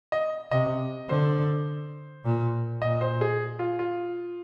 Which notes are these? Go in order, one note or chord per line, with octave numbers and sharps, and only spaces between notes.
D#5
C3 D#5
D3 C5
A#2
A#2 D#5
C5
G#4
F4
F4